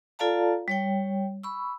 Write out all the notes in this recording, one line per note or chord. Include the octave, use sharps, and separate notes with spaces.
F4 A4 D5 F5 A5 A#5
G3 C#5 G5
B5 C#6 E6